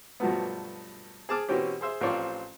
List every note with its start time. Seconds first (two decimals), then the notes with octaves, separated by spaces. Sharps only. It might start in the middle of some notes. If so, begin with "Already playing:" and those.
0.20 G2 B2 F3 F#3 A3 B3
1.29 G#4 A5 D6 F6
1.49 B2 E3 C4 C#4 G4
1.81 G#4 C5 E5
2.01 A1 F3 C4 F4 C#5 D5